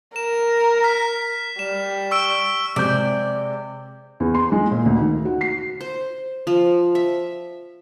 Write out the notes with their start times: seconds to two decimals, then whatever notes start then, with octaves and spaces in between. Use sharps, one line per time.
0.16 A#4 E7
0.84 F6 B6
1.59 G3 E7
2.11 C#6 E6 D7
2.76 C3 G#3 D5 G6
4.20 E2
4.35 C6
4.52 G#3
4.71 A#2
4.86 D2
4.99 D#3
5.25 F#4
5.41 C7
5.81 C5
6.47 F3
6.95 E5